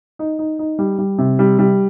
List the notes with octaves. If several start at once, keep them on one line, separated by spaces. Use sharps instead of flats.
D#4
D#4
D#4
G3
G3
C3
G3
G3